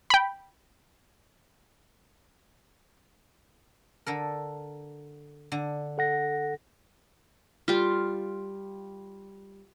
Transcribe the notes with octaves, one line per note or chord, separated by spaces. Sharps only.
G5 B5
D3 A4 A#4
D3
A4 F#5 A#6
G3 F4